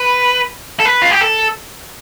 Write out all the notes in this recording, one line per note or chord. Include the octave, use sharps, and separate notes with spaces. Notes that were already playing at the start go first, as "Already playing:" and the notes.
Already playing: B4
A4
B4
F4
G4
A4